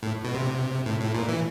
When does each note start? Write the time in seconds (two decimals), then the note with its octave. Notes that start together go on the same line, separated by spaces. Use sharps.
0.03 A2
0.24 B2
0.34 C3
0.86 A2
1.00 A2
1.15 A#2
1.28 E3